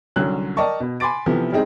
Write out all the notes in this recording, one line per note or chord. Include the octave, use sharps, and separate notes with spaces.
C2 D3 F#3 C#4 F#6
A#4 D5 D#5 G5 A5 C#6
B2
G#5 B5 C6 D6 A6 D7
C3 E3 F3 B3 A4
G3 G#3 C4 D#4 G#4